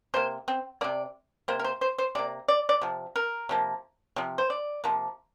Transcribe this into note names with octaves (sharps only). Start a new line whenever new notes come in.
C3 A#3 C5
C4
C3 A#3 D5
C3 A#3 C5
A#4
C5
C5
C5
C3 A#3 D5
D5
D5
C3 F3
A#4
C3 F3 A#3
C3 F3
C5
D5
C3 F3 A#3